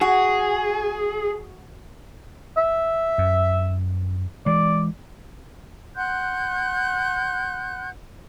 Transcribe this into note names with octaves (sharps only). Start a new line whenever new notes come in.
F#4 G#4
E5
F#2
E3 G#3 D5
F#5 C6 F#6 G6